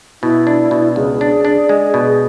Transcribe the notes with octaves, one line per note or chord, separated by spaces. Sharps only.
B2 E4
D4
B2
C#2 G#4
D4
D4
G#3
B2